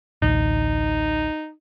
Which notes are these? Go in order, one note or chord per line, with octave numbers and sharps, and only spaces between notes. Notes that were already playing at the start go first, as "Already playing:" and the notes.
A1 D2 D#4